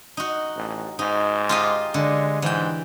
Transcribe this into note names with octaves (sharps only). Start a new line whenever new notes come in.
D#4 F#4
A1
G#2 D#4
F4 G4 D#5
D3 G#3
G#2 E3 G5